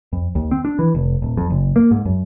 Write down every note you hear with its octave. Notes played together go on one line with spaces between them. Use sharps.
F2
D#2
C4
D4
E3
F1
D#1
F2
F#1
A#3
G#2
F#2